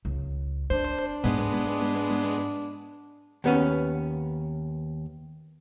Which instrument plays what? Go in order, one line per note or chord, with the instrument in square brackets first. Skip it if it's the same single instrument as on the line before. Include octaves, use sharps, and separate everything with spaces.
[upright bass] C#2
[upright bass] C4 [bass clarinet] D4 [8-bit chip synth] C5
[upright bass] G#2 [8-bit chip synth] G#3 B3
[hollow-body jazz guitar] D#2 B3 C#4